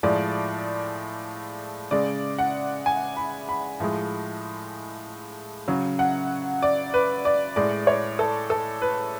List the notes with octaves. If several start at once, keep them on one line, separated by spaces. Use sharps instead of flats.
A2 F3 G#3 D5
C#3 G#3 D5
F#5
G#5
B5
B5
A2 F3 G#3
C#3 F#3
F#5
D5
B4
D5
A2 G#3 D5
C#5
A4
A4
B4